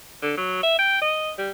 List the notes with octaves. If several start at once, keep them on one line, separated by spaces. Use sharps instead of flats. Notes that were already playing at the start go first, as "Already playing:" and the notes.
D3
F#3
E5
G5
D#5
G3